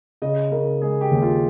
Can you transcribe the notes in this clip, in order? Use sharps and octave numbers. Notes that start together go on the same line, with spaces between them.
C#3 D#5
C#3 A#4
G#3 G#4
G4
D#2
F4